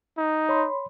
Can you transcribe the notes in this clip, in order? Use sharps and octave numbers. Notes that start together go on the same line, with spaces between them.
D#4
C#5 B5 C6